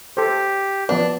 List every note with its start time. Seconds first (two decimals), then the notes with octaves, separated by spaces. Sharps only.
0.17 G4 A4 C5
0.89 F3 B3 D4 B4